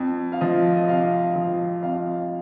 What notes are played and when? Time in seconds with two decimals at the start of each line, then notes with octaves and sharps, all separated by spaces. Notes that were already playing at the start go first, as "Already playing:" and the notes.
Already playing: F2
0.32 F5
0.41 F3 D#5
0.77 D#5
0.88 C3 F5
1.35 F3 D#5
1.83 F2 F5